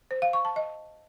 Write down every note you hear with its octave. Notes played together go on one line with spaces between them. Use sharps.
C5
F5
C#6
A5
D#5